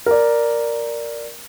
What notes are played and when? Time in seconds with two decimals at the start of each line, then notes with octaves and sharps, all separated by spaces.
0.06 A#4 D5